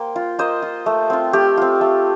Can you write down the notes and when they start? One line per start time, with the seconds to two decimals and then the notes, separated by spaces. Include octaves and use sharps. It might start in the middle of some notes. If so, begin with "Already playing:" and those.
Already playing: A#3 C5 G5
0.16 F4
0.39 A#3 C5 D#5
0.62 F4
0.86 A3
1.10 C4 F4
1.33 A3 G4
1.57 C4 F4
1.81 A3